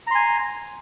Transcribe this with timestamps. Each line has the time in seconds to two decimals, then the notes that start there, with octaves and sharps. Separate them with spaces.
0.07 A#5
0.11 C6
0.15 G#5